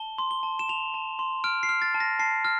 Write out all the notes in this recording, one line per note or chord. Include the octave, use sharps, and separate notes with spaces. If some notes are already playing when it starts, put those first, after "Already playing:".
Already playing: A5 G7
C6
G7
A5
E7
A5 F7
A5
C6
F6 D7
C7
F6
A6
A5
A#6
A5 C7
F6